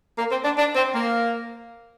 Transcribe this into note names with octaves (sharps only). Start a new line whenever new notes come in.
A#3
C4
D4
D4
C4
A#3